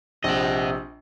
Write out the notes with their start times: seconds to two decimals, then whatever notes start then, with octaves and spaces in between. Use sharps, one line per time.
0.24 A#1 C3 D#5 F#5